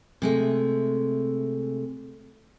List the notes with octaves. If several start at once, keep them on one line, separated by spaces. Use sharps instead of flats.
C3 G#3 A3